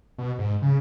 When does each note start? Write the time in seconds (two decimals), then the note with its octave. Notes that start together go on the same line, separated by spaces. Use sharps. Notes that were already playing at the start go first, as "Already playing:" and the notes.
0.18 B2
0.39 G#2
0.62 C#3